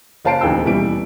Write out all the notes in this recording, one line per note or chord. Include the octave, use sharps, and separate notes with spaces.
F#1 F4 C5 A5 C7 D7
D#1 D2 E3 D#4 G5 E6
D#1 B2 E3 G3 E4 D7